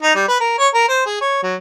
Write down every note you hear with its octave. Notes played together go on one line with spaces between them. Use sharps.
D#4
G3
B4
A#4
C#5
A#4
C5
G#4
C#5
F#3